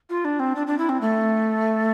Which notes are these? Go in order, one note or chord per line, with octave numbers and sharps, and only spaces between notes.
F4
D4
C4
D4
D4
E4
C4
A3